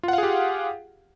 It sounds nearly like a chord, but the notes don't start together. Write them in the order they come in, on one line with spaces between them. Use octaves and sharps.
F4 F#5 F5 G#4 G4